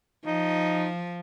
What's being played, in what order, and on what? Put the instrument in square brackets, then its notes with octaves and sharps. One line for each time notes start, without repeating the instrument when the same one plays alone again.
[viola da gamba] F3 [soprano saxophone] D#4